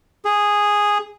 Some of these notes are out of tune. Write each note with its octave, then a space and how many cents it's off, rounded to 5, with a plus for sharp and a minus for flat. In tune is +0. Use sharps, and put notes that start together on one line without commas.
G#4 -5